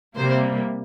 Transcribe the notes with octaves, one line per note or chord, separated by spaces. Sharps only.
C3 G3 A#3 C5